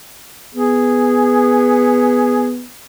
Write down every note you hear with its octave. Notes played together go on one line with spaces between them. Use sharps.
B3 G#4